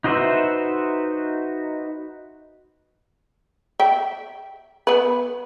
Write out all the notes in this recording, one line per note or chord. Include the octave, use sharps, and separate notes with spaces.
D#4 F#4 B4 C5 E5
E5 G5
B3 B4